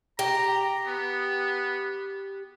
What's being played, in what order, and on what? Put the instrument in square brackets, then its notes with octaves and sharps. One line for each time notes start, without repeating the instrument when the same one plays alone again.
[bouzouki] G4 [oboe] A#5
[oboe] B3